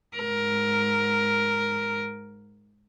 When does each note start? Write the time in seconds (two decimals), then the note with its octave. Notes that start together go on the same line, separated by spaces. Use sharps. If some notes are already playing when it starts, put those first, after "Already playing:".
0.17 G#2 A#4